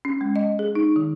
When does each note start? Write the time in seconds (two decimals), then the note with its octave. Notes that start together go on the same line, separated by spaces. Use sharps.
0.05 C#4
0.21 G#3
0.36 D#5
0.59 G#4
0.75 D#4
0.96 D#3